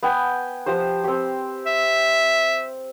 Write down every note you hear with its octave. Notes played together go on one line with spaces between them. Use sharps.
B3 G5 G#5
F3 G4 C5
C4 G4
E5